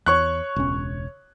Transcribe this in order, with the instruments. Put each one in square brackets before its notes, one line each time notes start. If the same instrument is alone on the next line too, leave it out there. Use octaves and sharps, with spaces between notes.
[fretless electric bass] E2 [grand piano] C#5 C#6 F#6
[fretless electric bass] E1 C#2 C#4